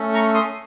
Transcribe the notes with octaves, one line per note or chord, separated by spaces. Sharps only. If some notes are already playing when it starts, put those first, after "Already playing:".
Already playing: A3 C#4 A4
A#5 C#6
C6 D#6